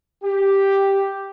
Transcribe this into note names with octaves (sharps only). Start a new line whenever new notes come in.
G4